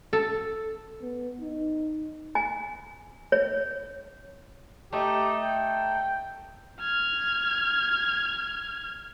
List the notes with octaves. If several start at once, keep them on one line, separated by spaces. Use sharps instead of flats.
A4
B3
D#4
G#5
C#5
A3 D#4 G4
G5
F6 G#6